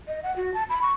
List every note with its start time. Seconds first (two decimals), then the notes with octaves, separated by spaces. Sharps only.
0.08 D#5
0.23 F#5
0.36 F#4
0.54 A5
0.70 B5
0.82 C#6